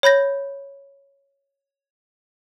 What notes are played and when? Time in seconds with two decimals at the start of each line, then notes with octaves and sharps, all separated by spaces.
0.03 C#5 B5 G6 A#6